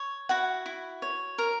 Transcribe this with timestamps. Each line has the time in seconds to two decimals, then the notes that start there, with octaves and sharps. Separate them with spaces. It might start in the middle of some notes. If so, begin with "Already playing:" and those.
Already playing: C#5
0.29 E4 F#4 F#5
0.66 E4
1.02 C#5
1.38 A#4